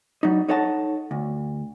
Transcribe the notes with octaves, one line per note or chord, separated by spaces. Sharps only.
F#3 G3 D#4
D#4 A4 C#5 D#5 F#5 A5
D2